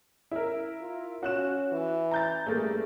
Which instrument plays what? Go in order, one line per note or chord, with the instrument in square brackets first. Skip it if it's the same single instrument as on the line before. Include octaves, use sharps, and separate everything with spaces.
[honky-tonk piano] E4 A#4
[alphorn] F4
[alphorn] C#4 [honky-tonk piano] F#4 F#6 E7
[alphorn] E3
[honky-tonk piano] A#5 G6 A6
[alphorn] G2 [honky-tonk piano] A3 A#3 G#4